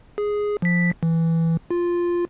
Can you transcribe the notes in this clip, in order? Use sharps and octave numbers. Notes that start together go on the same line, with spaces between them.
G#4
F3 B6
E3
F4